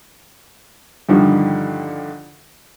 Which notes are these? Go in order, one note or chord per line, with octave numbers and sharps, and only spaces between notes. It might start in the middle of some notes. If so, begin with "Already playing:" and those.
G2 D3 D#3 F3 G3